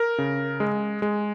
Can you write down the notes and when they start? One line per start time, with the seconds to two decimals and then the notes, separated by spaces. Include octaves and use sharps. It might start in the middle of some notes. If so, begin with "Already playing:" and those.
Already playing: A#4
0.18 C#3
0.60 G#3
1.02 G#3